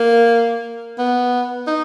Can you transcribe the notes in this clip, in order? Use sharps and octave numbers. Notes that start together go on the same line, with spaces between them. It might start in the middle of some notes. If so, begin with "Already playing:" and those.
Already playing: A#3
B3
D#4